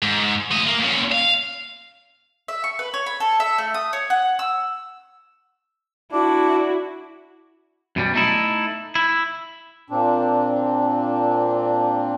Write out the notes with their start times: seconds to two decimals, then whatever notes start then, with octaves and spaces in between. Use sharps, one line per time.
0.02 G#2
0.51 A3 D#5
0.66 A#3
0.79 A#2 C#4
1.11 F5
2.48 E5
2.64 C#6
2.79 B4
2.94 C#5
3.06 B5
3.20 A4
3.40 E5
3.58 A3
3.74 D#6
3.93 C#5
4.10 F#5
4.39 E6
6.12 D4 E4 F#4
7.96 F#2 B2 G3
8.14 A3 D#4 E4
8.95 E4
9.90 A#2 C4 D4